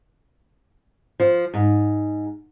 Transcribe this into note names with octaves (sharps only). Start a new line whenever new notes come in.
F3
G#2